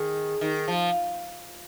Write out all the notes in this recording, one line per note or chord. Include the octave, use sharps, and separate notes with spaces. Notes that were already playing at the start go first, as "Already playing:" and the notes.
Already playing: D#3 G#4
D#3
F3